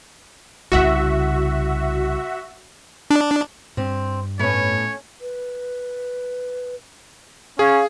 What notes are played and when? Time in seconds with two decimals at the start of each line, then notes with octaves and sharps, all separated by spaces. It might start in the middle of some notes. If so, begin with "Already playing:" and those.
0.72 C2 C#3 F#4 E5
3.11 D4
3.77 G2 C4
4.39 A2 A3 B3 C#4 C#5
5.21 B4
7.59 C#4 G#4 F5